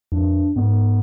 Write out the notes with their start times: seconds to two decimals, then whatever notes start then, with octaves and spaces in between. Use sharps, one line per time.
0.12 F2 D4
0.56 G#2 B3